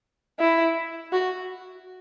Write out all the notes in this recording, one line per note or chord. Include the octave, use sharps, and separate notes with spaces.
E4
F#4